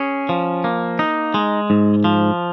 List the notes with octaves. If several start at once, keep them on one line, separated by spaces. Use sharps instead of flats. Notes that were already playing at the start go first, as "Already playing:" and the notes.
Already playing: C#4 G#4
F3
A#3
D#4
G#3
G#2
F3